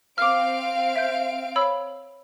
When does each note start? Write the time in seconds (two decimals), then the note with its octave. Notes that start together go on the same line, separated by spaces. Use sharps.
0.18 C4 F5 D6 F6 D7
0.96 E5 G6
1.56 C#5 B5 E6